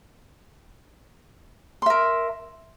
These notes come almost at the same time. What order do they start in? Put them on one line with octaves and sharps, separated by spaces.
C6 E5 A#4